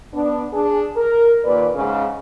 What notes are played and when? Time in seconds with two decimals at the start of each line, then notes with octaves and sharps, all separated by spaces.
0.14 B3 D4
0.53 D4 G#4
0.97 A#4
1.45 D#2 A#2 B4 D5
1.75 G#2 C#3